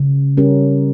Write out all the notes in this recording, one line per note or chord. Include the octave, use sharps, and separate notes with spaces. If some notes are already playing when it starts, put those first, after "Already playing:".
Already playing: C#3
G3 C#4 G4 A#4